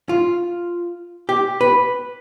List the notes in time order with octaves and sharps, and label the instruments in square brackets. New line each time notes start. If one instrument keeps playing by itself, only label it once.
[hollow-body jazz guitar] F4
G4
B4